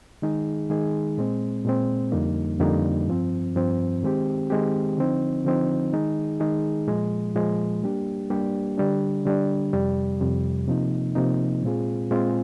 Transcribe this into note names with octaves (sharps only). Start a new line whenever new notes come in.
D#3 G#3 D#4 G#4
D#3 G#3 D#4 G#4
A#2 G#3 C4
A#2 G#3 C4
F2 D3 G3 A#3 D#4
F2 D3 G3 A#3 D#4
G2 F3 C4
G2 F3 C4
D#3 G#3 C4 G4
D#3 G#3 C4 G4
D3 F3 C4 D#4
D3 F3 C4 D#4
D#3 G#3 D#4 G#4
D#3 G#3 D#4 G#4
A#2 F3 G#3
A#2 F3 G#3
G3 A#3 D4 G4
G3 A#3 D4 G4
D3 G3 D4
D3 G3 D4
F2 C3 G3
F2 C3 G3
C3 F3 A#3 D#4
C3 F3 A#3 D#4
A#2 G#3 C4 F4 G#4
A#2 G#3 C4 F4 G#4